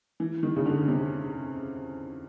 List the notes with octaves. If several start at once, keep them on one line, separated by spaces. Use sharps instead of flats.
E3
D#3
C#3
D3
C3